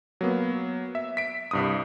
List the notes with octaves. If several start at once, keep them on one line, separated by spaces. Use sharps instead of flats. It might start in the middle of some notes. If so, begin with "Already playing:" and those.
F#3 A#3 B3
E5
B6 D7
C2 G2 D#6